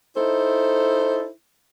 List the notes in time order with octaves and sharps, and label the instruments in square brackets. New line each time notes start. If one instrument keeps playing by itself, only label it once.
[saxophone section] D#4 E4 A4 C5